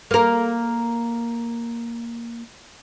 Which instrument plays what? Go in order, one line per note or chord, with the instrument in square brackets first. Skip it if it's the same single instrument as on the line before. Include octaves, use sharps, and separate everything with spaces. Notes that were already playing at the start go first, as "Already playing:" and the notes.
[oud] A#3 A#4